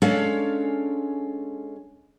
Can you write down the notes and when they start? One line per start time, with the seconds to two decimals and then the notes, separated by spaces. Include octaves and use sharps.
0.02 G#3 C#4 D4 A4 C#5 F5